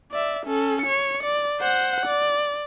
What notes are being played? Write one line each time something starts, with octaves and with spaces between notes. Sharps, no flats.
D5 E5
C#4 A4
C#5 C#7
D5
C5 F#5
D5